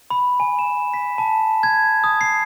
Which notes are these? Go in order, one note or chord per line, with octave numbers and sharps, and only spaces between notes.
B5
G#5
E7
B6
A5
G#6
D#6
C7